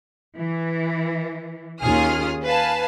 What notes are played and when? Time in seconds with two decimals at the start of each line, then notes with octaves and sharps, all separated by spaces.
0.36 E3
1.81 D#2 C#4 F4 G#4 D#6 F6
2.45 B4 F5 G#5 A5